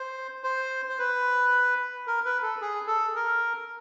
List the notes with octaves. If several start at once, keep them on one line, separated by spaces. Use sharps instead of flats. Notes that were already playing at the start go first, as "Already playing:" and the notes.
Already playing: C5
C5
C5
B4
A#4
B4
A4
G#4
A4
A#4